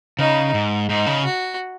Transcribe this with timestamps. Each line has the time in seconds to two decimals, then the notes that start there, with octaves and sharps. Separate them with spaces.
0.19 C#3 D#4
0.54 G#2
0.89 G#2 D#4
1.06 C#3
1.25 F#4